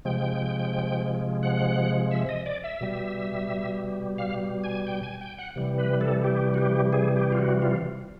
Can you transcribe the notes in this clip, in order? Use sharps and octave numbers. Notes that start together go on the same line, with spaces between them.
C3 F3 G#3 G5
F#5
E5
D#5
D5
E5
B2 G3
F5
G#5
G5
G#5
G5
F#5
C3 E3 G3
B4
A4
G4
F#4
G4
G#4
G4
F4
F#4
F4